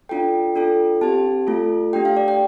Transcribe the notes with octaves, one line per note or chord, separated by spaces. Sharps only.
D4 F4 A4 G5
D4 F4 A4
C4 G4 A5
A3 F4 A4
A3 D4 G4 G5
F5
D5
G5